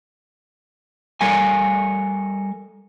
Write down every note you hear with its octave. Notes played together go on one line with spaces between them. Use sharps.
G3 A4 A#4 F5 G#5